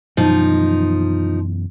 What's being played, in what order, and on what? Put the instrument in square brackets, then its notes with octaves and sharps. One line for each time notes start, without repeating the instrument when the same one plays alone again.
[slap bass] F#2 B2 E3 [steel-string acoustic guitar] F3 D#4